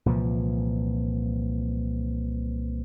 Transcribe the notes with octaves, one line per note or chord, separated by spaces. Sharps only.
C2 A#2 E3 F3